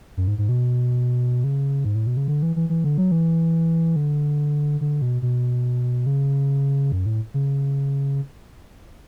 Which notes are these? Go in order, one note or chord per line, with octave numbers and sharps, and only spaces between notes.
F#2
G#2
G#2
B2
C#3
G#2
A2
B2
C#3
D3
E3
E3
E3
D3
F#3
E3
D3
D3
B2
B2
C#3
F#2
A2
C#3